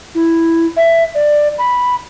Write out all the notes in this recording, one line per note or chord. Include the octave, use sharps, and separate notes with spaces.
E4
E5
D5
B5